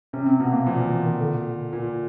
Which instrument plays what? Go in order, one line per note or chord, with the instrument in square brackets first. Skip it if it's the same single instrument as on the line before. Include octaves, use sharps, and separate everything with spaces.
[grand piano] C3 [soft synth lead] C#4
[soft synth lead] C4
[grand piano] B2 [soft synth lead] B3
[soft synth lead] A#3
[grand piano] A#2 [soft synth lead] F3
[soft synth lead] E3
E3
D#3
D3
[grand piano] A#2